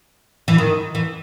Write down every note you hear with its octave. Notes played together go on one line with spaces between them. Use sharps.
E3
D#3
E3